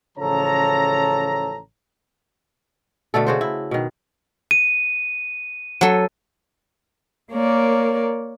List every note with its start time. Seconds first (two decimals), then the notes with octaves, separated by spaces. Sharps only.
0.18 A1 C#3 F3 A4 C#5 A#5
3.14 B2 D3 A3 A4
3.27 C#3 F#4 C5
3.41 E4
3.71 B2 D#3
4.51 D#7
5.81 F#3 A4
7.32 A#3 A#4 C#5 D5